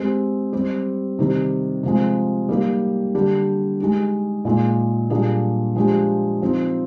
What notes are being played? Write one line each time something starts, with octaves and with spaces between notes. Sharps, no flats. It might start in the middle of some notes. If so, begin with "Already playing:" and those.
Already playing: G#3 C4 G4
G3 C4 G4
C3 D#3 G3
C3 F3 G#3
G3 A#3 D#4 G4
D3 G3 D4 G4
G#3 D#4 G4
A#2 G#3 D#4 G#4
A#2 G3 A#3 D4 G#4
F3 G#3 D4 G4
F3 C4 D#4